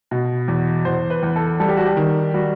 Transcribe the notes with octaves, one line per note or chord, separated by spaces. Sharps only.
B2
E2
E2 C5
B4
E2
A4
G3 A4
G4
F#4
G4
D#3
G3 F#4